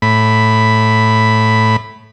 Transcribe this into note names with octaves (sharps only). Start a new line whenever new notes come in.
A2 B5